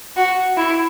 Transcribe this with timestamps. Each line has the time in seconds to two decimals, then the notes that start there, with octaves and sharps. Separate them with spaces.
0.17 F#4
0.57 E4